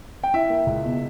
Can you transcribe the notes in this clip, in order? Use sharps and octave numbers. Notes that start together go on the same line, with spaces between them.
G5
E4 E5
A#3
C#2
B2